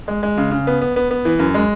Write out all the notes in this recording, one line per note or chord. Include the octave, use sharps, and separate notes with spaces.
G#3
G#3
C#3
C#3
B3
B3
B3
B3
E3
F#2
G#3